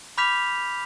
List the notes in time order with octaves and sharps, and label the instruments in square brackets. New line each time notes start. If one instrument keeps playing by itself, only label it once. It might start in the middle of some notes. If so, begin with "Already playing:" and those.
[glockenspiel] B5 D6 F6 G6 B6 F7